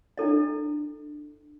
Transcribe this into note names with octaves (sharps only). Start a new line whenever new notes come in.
D4 E4 A4 D#5